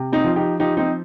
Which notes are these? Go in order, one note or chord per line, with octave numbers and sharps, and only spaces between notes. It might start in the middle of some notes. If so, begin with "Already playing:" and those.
Already playing: C3
C4 D#4
F3
D#4 G4
F3 D#4 G4
C4 D#4